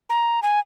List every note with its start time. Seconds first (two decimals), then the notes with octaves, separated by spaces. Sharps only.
0.10 A#5
0.42 G#5